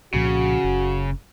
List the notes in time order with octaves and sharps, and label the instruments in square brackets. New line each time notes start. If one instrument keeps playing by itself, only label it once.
[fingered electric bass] C2 A#2 F3 [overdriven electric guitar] C#3 [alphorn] F#4
[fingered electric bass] F#1